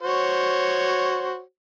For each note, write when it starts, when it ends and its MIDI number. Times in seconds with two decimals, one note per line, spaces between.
0.03 1.40 66
0.03 1.40 72
0.03 1.40 73